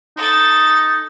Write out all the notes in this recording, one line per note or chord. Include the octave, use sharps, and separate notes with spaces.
D#4 A4 A6